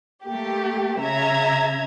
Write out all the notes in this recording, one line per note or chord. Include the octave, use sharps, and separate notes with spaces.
A3 A#3 G4
C#3 E5 A#5 G#6